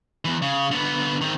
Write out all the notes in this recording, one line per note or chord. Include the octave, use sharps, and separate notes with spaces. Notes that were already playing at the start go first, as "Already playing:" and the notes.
E2 E3
C#3
D3 B3
D#3 C4